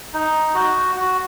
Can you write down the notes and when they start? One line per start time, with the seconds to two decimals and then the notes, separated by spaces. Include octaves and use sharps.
0.14 D#4
0.54 F#4
0.96 F#4